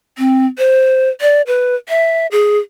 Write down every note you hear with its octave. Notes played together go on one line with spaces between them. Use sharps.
C4
C5
D5
B4
E5
G#4